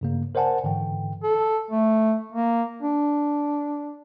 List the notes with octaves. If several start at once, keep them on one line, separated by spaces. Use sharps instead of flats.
G2 C#3 A#3
A#4 C5 D5 F#5 G#5 A5
G#2 D3 E3 G5
A4
A3
A#3
D4